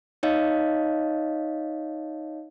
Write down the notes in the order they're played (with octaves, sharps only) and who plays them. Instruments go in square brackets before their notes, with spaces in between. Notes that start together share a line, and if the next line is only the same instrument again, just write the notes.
[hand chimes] D#4 C#5 D#5 F5